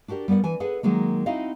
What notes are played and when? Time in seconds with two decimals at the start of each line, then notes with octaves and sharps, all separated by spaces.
0.08 D4 F#4 G4 A#4 D5
0.28 G3 B3 A#4 D5 F#5
0.44 E3 G#5
0.60 G#4 A4 B4 F#5
0.83 D#3 F#3 G#3 A#3
1.26 C4 D#4 E4 F#4 D#5 F5